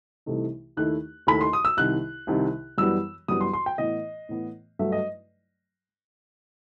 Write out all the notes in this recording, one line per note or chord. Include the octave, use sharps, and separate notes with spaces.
C2 C3 E3 A3 D#4
D#2 D#3 A3 E4 F#6
D#2 D#3 A3 E4 B5
C6
D#6
E6
C2 C3 D#3 F#6
C2 C3 D#3
F#2 E3 G3 B3 E6
F#2 E3 G3 B3 D#6
C6
C6
G5
A2 E3 B3 D#5
A2 E3 B3
G2 F#3 A3 E5
D#5